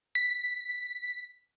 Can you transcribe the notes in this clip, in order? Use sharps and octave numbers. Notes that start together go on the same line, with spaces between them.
B6